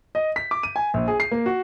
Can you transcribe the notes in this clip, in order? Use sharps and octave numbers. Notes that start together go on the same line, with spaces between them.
D#5
B6
D6
D#7
G#5
A#1
G#4
C7
A#3
F#4